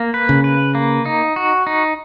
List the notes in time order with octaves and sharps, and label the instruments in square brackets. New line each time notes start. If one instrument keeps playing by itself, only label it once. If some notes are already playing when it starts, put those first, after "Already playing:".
Already playing: [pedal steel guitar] A#3
B4
[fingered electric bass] C#3
[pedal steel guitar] B4
A#3
D#4
F#4
D#4